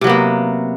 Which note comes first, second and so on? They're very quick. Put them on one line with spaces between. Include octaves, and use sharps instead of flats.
C3 F#3 B3 A#3